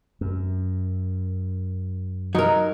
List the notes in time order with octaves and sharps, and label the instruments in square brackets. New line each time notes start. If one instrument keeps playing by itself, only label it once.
[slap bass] F#2
[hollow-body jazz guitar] F#3 A#4 [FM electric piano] D#4